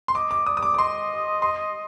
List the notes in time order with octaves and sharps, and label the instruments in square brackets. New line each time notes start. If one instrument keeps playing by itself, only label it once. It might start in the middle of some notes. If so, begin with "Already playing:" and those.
[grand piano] C6
[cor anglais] D#5 [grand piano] D6
[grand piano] D6
[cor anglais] D5 [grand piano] D#6
[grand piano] D#6
D6
D6
[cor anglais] D#5 [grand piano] C6
[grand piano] C6